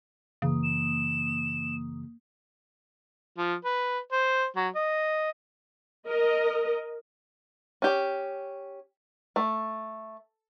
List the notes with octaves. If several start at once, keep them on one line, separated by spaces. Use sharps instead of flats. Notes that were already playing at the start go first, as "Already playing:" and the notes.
F#2 C#3 E3 A#3 D#6
E7
F3
B4
C5
F#3
D#5
A#4 D#5
C#4 G4
A3